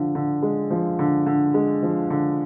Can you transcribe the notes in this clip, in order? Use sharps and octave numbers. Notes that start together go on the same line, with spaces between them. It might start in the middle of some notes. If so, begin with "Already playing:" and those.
Already playing: D3 F3
D3
G#3
F3
D3
D3
G#3
F3
D3